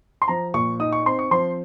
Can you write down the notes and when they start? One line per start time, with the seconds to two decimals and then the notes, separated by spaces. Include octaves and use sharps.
0.22 C6
0.28 F3 A#5
0.54 A#2 C#6
0.80 D#4 D#6
0.93 C#6
1.06 C4 C6
1.19 C#6
1.31 F3 C6